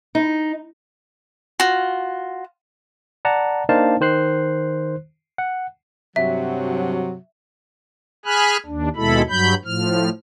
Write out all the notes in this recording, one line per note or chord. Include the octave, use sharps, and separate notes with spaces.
D#4
F4 F#4
D5 F#5 A5 A#5
A#3 D4 D#4 C5 F5 A5
D#3 C5 F#6 C7
F#5
G2 C3 F#3 E5
G#4 G#5 B5 F6 F#6
D#2 D4
D#2 B2 G#3 E4 A4 B5
G2 F#3 B5 G6
A2 F3 F6